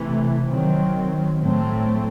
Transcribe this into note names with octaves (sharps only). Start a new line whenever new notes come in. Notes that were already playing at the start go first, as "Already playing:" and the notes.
Already playing: C3 E3 A3
D#3 F#3 C4
A2 F#3 A3 C4